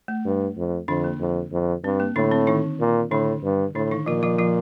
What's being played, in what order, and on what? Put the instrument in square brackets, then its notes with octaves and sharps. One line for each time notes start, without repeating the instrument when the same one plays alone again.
[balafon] A3
[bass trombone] G2
F2
[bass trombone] F2 [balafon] D3 D4
[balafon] A#3
[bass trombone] F2
F2
[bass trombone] G2 [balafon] C4
[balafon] A#3
[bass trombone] A2 [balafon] D3 D4
[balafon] C4
D#3 D#4
[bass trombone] A#2
[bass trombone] A2 [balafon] D3 D4
[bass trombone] G2
[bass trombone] A2 [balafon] D3 D4
[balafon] D#3 D#4
[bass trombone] A#2 [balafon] F3 F4
[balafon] F3 F4
F3 F4